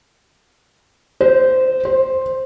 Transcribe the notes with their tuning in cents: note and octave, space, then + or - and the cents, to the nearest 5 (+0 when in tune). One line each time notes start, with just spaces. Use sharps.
C5 -15
C5 +5